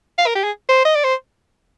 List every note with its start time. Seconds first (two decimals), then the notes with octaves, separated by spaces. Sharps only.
0.19 F5
0.26 A#4
0.35 G4
0.43 G#4
0.69 C5
0.85 D#5
0.95 D5
1.04 C5